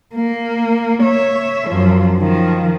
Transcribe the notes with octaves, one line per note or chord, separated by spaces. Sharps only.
A#3
C#5 E5
F#2 F3
D#3 F3